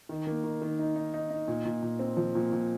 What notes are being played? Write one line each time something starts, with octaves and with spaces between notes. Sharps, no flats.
D#3
A#3
D#3
D#3
D#4
D#4
D#4
D#4
A#2
A#2
A#2
C4
F3
A#2
A#2